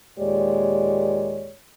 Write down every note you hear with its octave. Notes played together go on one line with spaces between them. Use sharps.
D#2 A#2 G#3 G4 C#5 D5